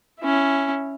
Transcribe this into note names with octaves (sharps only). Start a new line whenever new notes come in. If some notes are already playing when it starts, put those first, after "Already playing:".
C#4 E4